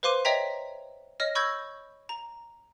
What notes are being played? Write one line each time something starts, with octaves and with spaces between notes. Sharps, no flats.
B4 C5 F5 C6 D6 D#7
C#5 D#5 E5 G5 A#5 B6
C#5 D#5 F6 A#6
B5 C#6 E6 G6 G#6 A#6
A#5